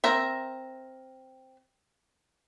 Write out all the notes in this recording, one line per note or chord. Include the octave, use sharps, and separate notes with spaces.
C4 A#4 E5